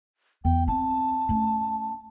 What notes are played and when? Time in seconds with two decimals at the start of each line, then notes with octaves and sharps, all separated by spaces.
0.45 E2 G5
0.68 C4 A5
1.29 A3 C#4